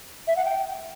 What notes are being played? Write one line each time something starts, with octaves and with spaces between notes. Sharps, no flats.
E5
F#5
G5